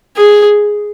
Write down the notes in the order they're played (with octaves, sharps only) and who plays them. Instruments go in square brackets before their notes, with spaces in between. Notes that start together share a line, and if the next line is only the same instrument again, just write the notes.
[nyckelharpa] G#4